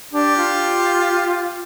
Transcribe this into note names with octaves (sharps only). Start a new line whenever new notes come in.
D4 G4
F4